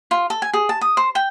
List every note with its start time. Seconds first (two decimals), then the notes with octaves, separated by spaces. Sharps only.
0.11 F4
0.30 A4
0.42 G#5
0.54 G#4
0.69 A5
0.81 D#6
0.97 C5
1.15 G5